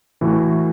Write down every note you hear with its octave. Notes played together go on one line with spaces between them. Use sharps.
A2 E3 A3 F#4